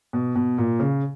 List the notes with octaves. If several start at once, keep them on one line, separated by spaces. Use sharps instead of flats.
B2
B2
A#2
C#3